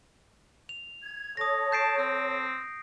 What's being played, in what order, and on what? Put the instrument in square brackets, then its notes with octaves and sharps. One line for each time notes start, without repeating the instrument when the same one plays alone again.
[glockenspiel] F7
[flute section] G#6
[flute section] A4 C#5 [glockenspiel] D#6 A#6
[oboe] A5 [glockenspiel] G6 C7 D7
[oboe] C4